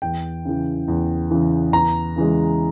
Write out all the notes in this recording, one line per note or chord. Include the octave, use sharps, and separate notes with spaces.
E2 G5
C#3 E3
E2
C#3 E3
E2 A#5
C#3 E3 G#3